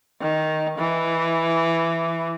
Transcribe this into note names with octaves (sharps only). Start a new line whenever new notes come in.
D#3
E3